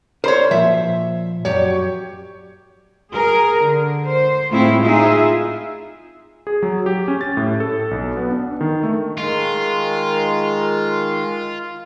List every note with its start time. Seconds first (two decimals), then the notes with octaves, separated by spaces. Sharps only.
0.24 A#4 C5 C#5 B5 C6
0.51 A#2 F3 E5
1.45 F#2 G4 C#5
3.11 G#4 A#4
3.61 D3
4.06 C5
4.51 A2 G#3 A3 C4 E4 F4
4.85 D#4 F4 G#4 E5
6.47 G#4
6.62 F#3
6.86 G4
7.08 C#4
7.21 A6
7.37 A2
7.60 A4
7.91 B1
8.17 B3
8.30 D4
8.61 D#3
8.83 A3
9.18 D#3 G#3 F4 A#4